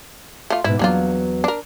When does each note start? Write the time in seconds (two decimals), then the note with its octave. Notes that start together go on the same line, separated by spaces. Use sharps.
0.50 A3 F4
0.64 G#2 B2 E4
0.79 E2 F#3 A#3 D4 F4
1.44 D4 A#4